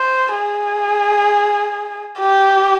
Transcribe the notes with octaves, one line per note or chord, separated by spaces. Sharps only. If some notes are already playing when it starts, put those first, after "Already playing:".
Already playing: C5
G#4
G4